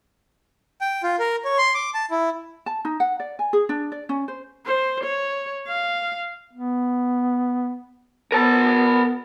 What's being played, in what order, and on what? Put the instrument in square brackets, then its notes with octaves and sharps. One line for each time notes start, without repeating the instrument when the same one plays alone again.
[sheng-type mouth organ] G5
F4
A#4
C#5
C6
D6
A5
E4
[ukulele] A5
D#4
F#5
D5
G#5
G#4
D4
D5
C#4
C5
[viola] C5
C#5
F5
[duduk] B3
[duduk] B3 [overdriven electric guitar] A#4 A5